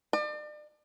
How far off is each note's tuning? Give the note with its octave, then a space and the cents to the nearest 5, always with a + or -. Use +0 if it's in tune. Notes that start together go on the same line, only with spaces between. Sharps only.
D5 +40